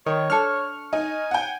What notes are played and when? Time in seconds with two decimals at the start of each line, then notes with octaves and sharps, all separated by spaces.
0.06 D#3 C#5 G5
0.30 D4 A4 C#6 F6
0.93 D#4 G#5
1.31 F#5 G5